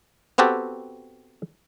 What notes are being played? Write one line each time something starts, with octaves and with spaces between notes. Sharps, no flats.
B3 C4 F#4 G4 A4